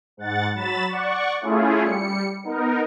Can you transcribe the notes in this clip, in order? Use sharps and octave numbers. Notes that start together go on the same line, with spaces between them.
G#2 F#5 A6
F#3 B5 A6 E7
D5 F#5 C#6
A3 C#4 E4 F4 G#4
G3 C#7
B3 D#4 A#4